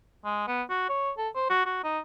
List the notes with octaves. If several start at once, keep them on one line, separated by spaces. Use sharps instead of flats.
G#3
B3
F#4
C#5
A4
C5
F#4
F#4
D#4